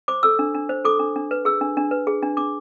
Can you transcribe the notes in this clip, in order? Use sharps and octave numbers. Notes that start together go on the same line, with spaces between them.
C5 D6
A4 E6
D4
D4
C5
A4 D6
D4
D4
B4
G#4 E6
D4
D4
B4
G#4
D4
D4 D6